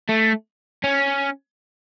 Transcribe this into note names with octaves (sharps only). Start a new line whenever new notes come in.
A3
C#4